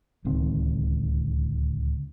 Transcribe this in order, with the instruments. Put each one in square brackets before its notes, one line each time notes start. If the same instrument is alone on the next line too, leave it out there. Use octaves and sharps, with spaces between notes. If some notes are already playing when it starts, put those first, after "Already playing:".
[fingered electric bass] D1 C#2 D#3 C4